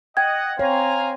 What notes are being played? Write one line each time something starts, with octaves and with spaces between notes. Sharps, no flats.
D#5 F#5 G5 G#6
C4 C#5 F5 G#5 A#5